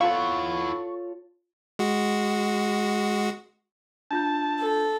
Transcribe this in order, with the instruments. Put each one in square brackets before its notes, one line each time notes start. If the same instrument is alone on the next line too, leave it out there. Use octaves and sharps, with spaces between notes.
[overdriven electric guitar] E4 F#5 [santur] F4 A4 C#5 [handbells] F5 [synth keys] C#6
[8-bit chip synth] G#3 F#4
[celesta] D4 F4 G6 [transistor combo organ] A5
[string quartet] A4